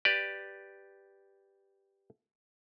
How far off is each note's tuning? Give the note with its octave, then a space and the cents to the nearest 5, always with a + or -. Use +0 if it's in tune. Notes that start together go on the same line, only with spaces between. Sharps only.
G4 +0 B4 +0 D5 +0